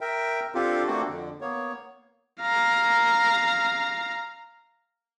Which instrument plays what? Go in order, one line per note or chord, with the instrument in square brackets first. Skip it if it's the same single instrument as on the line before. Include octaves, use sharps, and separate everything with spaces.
[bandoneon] A#4 E5 G5
C4 D4 F4 G4 A4
A3 A#3 C4 D4 F#4 A4
F2 D3
A#3 B3 C#5
[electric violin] F5 A#5